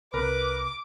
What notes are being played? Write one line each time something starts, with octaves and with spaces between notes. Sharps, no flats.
C2 A#4 B4 D6